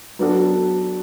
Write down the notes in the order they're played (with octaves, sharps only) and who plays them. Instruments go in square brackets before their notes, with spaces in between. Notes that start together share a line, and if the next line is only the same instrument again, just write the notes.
[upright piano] F#3 B3 D4 F#4 A4